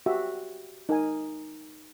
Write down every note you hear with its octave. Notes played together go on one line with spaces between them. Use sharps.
F#4 G4 E5
D#4 A#4 G#5